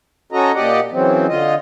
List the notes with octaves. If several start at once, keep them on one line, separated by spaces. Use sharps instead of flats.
C#4 F#4 A4 D#5 A#5
A#2 G4 D5 D#5 F#5
C#3 E3 F#3 C4
D3 F4 D#5